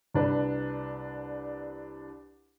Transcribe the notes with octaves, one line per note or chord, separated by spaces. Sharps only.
C2 D4 B4